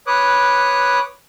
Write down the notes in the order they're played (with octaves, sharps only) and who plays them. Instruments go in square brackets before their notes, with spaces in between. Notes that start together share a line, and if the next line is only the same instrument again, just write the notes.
[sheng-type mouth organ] B4 C#5 D6 D#6 F#6